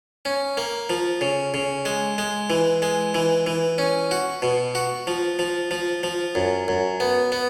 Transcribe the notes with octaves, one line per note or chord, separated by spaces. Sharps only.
C#4
A#3
F3
C#3
C#3
G#3
G#3
E3
G#3
E3
E3
C#4
F#4
B2
F#4
F3
F3
F3
F3
F#2
F#2
B3
B3